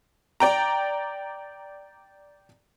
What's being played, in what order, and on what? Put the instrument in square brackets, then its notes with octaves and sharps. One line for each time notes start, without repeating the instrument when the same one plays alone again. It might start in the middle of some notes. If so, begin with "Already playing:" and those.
[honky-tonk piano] D5 G5 A#5